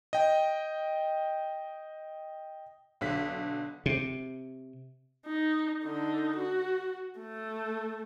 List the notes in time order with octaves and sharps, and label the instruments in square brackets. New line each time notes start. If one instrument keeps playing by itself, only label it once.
[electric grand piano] D#5 G5
[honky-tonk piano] B1 D3 B6
[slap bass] C3
[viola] D#4
D3 D#4
F#4
A3